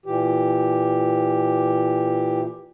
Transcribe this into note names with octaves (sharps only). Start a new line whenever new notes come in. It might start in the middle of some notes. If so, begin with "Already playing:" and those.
A#2 E3 G4